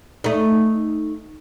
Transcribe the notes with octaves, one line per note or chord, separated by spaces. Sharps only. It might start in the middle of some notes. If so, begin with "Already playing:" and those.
A3 D#4